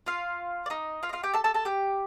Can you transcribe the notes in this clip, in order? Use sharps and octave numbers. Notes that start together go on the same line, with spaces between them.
F4 F5
D5
D#4 D#5
F4 F5
D#5
F4 F5
G4 G5
A4 A5
A4 A5
A4 A5
G4 G5